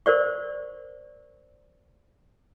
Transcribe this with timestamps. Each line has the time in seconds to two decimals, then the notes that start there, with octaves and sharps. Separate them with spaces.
0.06 A#4 C5 D5 C#6